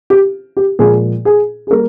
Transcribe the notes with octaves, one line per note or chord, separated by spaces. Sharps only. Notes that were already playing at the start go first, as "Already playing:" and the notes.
G4
G4
A#2 F3 G#3 G#4
G#4
G#4
G3 A#3 A#4